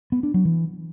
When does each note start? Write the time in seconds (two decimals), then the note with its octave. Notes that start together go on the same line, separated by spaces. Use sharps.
0.12 B3
0.23 D4
0.34 F#3
0.45 E3